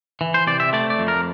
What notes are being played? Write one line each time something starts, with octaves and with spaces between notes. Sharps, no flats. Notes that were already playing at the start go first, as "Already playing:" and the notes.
E3
C5
C3 D5
E5
A3 D5
D5
F2
A#4